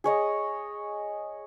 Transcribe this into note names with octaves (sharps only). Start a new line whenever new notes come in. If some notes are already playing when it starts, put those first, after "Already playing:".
G#4 C#5 D#5